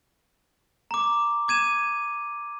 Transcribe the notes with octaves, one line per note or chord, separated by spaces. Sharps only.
A#5 D6
D6 G#6 D#7 E7